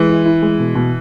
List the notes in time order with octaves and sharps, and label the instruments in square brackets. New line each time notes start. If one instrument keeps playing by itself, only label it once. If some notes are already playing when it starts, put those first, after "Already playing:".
Already playing: [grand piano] E3 [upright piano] G#3
[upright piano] E4
E4
G#3
B2
B2